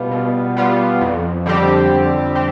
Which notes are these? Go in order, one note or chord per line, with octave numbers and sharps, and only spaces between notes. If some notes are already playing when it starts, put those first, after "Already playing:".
Already playing: B2 G3 B3 F4
B2
G3 B3 F4
F2
D3 G3 C4 G4
F2
C4 G4